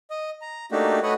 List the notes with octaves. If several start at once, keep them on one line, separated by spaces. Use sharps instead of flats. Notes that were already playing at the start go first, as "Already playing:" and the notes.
D#5
A#5
A3 A#3 D4 D#4 F#4 G4
A3 F#4 B4 C#5 D#5 F#5